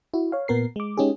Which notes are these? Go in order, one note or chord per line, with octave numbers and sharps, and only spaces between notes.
E4 F#4
C#5 F5
A#2 B3 A#4 C7
G#3 D6
G#3 C#4 D#4 G4 G#4